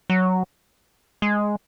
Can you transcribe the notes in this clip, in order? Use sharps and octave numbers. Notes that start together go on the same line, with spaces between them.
F#3
G#3